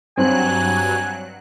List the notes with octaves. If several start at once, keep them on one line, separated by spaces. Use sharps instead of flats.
G2 F#3 C4 G#5 F#6